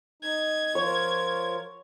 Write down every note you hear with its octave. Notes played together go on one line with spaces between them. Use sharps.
D#4 G#6
F3 F4 A#4 C#5